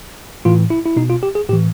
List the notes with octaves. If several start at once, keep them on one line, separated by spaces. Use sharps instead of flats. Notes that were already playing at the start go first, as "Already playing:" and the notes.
A2 E3 F4
E4
E4
B2 D#4
F4
G4
G#4
A2 E3 G4